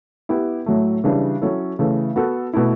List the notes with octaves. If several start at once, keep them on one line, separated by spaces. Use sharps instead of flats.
B3 E4 G4
A2 F#3 A3
C#3 E3 G3 D4
F#3 C#4 E4 A4
C#3 E3 A3
B3 F#4 A4
B2 A3 E4